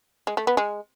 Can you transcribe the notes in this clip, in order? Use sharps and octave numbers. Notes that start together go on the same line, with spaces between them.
G#3
A3
B3
G#3